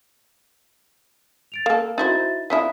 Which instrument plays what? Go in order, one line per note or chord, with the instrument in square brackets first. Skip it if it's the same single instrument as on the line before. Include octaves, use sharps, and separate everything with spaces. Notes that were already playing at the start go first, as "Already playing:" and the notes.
[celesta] A6 D7 F7
[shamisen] A#3 A4 [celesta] F5
[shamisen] D#4 E4 C5 [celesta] F#4 E5 A6
[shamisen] F3 D4 E4 [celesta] D#6 B6